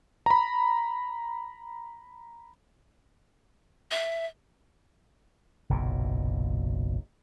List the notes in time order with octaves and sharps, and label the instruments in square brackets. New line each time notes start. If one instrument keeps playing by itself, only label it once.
[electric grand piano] A#5 B5
[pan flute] E5
[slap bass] F#1 B1 A#2